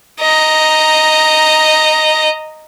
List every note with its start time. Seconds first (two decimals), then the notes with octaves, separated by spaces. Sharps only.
0.21 D#5 A#5